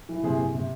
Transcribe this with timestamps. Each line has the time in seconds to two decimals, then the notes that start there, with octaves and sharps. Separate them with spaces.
0.09 E3
0.23 C3 G#4
0.39 C3
0.55 C3